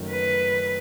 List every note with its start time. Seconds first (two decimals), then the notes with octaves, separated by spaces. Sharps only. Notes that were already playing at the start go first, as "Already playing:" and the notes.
Already playing: F#1 F#2 D#3 F#3 A3
0.10 B4